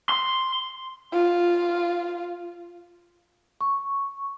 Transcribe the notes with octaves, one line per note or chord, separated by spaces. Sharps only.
C6
F4
C#6